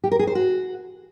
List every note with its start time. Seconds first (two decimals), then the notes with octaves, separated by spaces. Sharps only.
0.04 G4
0.12 A#4
0.19 G#4
0.27 C5
0.35 F#4